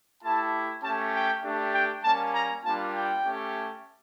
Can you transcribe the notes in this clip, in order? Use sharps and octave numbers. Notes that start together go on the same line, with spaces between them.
A3 E4 G4 A5
A3 C#4 G4 A5
G5
A3 D4 G4
G5
G3 A#3 C#4 A5
A#5
G3 A#3 D4 F4 A5
G5
A3 C#4 G4